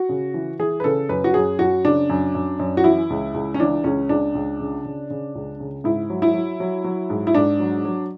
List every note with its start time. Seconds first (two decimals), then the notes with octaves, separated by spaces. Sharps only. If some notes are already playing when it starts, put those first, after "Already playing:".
Already playing: F#4
0.09 C#3
0.34 E3
0.59 E3 G#4
0.80 B4
0.84 C#3 A4
1.09 F#2 B4
1.24 F#4
1.34 F#2 G#4
1.59 F#2 F#4
1.84 C#3 D4
2.10 F#2
2.35 F#2
2.59 F#2
2.77 F#4
2.84 E3 E4
3.10 C#2
3.34 C#2
3.54 C#4
3.60 E3 D4
3.84 C#2 C#4
4.09 C#2 D4
4.35 C#2
4.60 C#3
4.85 C#3
5.10 C#3
5.35 C#2
5.60 C#3
5.84 G#2 E4
6.10 F#3
6.22 E4
6.34 F#3
6.60 F#3
6.84 F#3
7.10 G#2
7.27 E4
7.35 G#2 D4
7.60 F#3
7.85 F#3